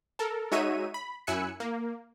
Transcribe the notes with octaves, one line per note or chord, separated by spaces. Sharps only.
A4 A#4
G#3 D#4 F#4 C#5 E5 D#7
B5
F#2 E4 G#5 E6 F#6 C#7
A#3